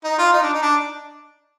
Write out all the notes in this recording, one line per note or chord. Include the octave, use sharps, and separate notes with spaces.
D#4
F4
D#4
D4
D#4
D4